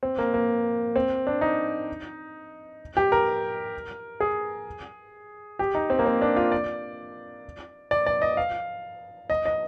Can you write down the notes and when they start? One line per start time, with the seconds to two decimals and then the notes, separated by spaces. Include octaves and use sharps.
0.03 C4
0.18 A#3
0.34 A#3
0.96 C4
1.27 D4
1.41 D#4
2.97 G4
3.12 A#4
4.20 G#4
5.59 G4
5.75 D#4
5.90 C4
5.99 A#3
6.06 C4
6.22 D4
6.36 F4
6.52 D5
7.91 D5
8.06 D5
8.22 D#5
8.37 F5
9.30 D#5
9.46 D#5